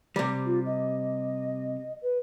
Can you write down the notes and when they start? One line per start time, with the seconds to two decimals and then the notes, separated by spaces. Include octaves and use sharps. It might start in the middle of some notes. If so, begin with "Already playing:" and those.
0.16 C3 G3
0.46 F4
0.66 D#5
2.03 B4